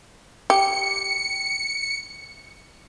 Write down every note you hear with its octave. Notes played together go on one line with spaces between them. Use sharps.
G4 C#7